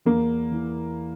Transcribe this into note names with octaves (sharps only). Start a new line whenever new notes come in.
E2 A#3
E3